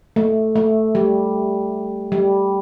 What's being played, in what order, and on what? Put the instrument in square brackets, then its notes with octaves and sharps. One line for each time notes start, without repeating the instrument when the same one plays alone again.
[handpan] A3
A3
G3
G3